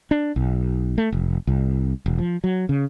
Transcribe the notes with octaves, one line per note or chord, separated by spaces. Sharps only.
D4
B1
A3
F1
C2
E1
F3
F#3
C#3